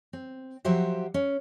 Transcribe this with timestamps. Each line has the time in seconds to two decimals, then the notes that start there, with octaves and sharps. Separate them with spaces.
0.13 C4
0.65 F3 F#3 F#4 G4 C5 E5
1.14 C#4